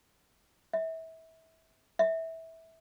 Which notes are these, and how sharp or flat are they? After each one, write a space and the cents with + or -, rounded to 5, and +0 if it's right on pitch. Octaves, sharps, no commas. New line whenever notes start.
E5 -30
E5 -20